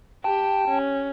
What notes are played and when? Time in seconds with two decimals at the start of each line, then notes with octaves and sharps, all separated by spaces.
0.24 G4 G5 A5
0.68 C#4